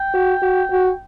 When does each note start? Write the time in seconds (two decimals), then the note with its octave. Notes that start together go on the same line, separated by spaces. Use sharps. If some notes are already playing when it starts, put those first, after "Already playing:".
Already playing: G5
0.14 F#4
0.42 F#4
0.71 F#4